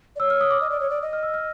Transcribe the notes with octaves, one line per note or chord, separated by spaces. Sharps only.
D5
C#5 E6
F6
D#6
D6
D#5
D5
C#5
D5
D#5
F6
E6
F6